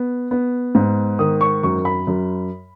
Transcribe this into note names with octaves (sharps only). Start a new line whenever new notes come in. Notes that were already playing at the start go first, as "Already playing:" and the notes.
Already playing: B3
B3
G#2
D#3 D#6
C#6
F#2 C#6
B5
F#2